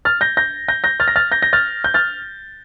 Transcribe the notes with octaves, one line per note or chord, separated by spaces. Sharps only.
F6 A6
G6 A#6
G6 A#6
G6 A#6
G6 A#6
F6 A6
A#6
F6 A6
G6 A#6
G6 A#6
F6 A6
G6
F6 A6